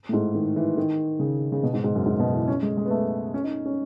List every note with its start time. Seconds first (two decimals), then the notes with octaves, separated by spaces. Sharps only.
0.09 A2
0.13 G#2
0.35 D#3
0.56 E3
0.77 D#3
1.19 C#3
1.52 C#3
1.63 B2
1.73 G#2
1.84 G#2
1.95 F#2
2.06 G#2
2.19 B2
2.33 E3
2.48 C#4
2.62 G#3
2.77 G#3
2.86 B3
2.90 A3
3.34 C#4
3.44 D#4
3.65 C#4